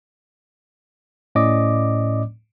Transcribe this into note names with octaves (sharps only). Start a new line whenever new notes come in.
A2 C#4 D5 D#5 D6